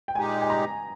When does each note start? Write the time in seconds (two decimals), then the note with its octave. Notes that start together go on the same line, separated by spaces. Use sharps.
0.08 G5
0.15 A#2 G#3 D#4 G4 G#5
0.41 G#5
0.50 A#5